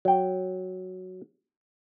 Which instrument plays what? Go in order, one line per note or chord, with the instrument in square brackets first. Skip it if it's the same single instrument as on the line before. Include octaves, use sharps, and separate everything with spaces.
[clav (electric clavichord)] F#3 G5